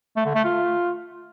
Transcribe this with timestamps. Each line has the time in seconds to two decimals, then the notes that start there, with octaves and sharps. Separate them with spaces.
0.17 A3
0.26 D3
0.35 A3
0.44 F4